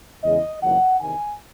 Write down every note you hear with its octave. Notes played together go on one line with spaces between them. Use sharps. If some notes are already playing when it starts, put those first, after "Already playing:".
E2 C#3 G#3 C#4 E4 D#5
F#1 E2 D#3 F#3 F#5
E2 C3 D#3 G#5